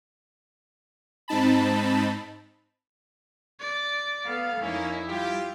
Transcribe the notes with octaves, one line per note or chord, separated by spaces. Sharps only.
G#2 C4 D#4 A5 B5
D5
B3 A4 F5
F2 A#3 C#4 D#4 E4
G3 F4 G4